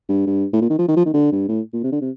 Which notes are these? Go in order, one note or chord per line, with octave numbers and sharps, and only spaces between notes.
G2
G2
A2
A#2
D#3
F3
D#3
F3
D#3
D3
G2
A2
A#2
C3
D3
C3